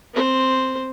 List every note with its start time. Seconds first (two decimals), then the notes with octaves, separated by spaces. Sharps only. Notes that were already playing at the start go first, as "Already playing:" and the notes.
0.14 C4 C5